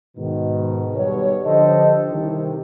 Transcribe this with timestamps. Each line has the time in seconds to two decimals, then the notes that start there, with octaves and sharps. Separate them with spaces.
0.17 G#2 B2 D#3
0.94 B1 B2 G3 C#5
1.45 D3 F3 G4 A4 C5 D#5
2.11 C2 C3 D#3